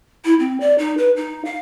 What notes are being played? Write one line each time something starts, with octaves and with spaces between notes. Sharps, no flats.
E4
C4
D5
D#4
B4
D#4
F5